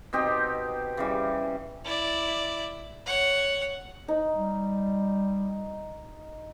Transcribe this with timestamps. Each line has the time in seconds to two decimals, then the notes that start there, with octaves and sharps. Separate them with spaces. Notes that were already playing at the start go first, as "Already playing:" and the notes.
0.13 B2 C4 D#4 G4
0.97 C#3 E3 G3
1.85 E4 D5
3.06 C#5 F#5
4.08 D#4
4.36 G3